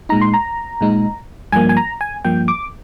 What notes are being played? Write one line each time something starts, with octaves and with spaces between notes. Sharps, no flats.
A#2 G#3 D#4 A#5
C6
A#5
A#2 G#3 D#4
G2 F3 A#3 G#5
G#5
A#5
G#5
G2 F3 A#3 G5
D6